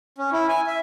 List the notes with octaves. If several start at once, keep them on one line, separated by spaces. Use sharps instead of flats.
C#4
E4
G#5
E5